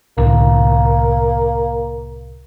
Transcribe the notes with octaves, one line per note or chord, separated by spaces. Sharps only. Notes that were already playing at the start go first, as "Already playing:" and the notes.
C2 A2 D3 A#3